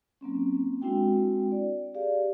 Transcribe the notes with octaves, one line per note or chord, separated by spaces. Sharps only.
F#3 A#3 C4 C#4
G#3 C4 D4 E4 F#4 G5
D5
G4 G#4 D5 F5